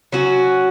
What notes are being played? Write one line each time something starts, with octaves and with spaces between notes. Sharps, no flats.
F#3 C#4 F#4